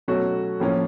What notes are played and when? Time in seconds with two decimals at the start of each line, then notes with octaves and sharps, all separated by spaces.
0.08 B2 F#3 A3 C#4 F#4
0.60 A2 F3 A#3 C#4